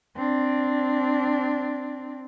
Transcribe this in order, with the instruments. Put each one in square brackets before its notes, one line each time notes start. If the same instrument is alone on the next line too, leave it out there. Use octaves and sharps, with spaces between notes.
[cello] C4 D4